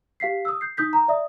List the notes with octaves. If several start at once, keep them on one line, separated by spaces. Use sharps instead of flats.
G4 F5 B6 C7
D#6 E6
G6 C7
D#4 D#6 G6 B6
A#5
D5 E5 D#6